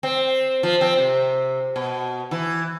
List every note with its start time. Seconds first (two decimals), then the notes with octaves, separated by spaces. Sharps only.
0.03 C4
0.63 F3
0.81 C4
0.98 C3
1.76 B2
2.31 E3